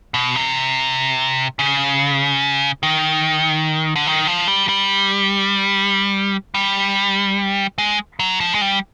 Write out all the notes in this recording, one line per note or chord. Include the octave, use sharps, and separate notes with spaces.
B2
C3
C#3
D#3
D3
D#3
F3
G3
G3
G3
G#3
F#3
F3
G#3
G3